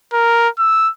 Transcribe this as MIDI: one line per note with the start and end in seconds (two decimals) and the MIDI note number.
0.13 0.49 70
0.59 0.90 88